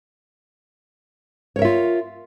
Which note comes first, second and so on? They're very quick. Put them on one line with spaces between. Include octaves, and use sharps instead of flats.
C#5 A#4 E5 F4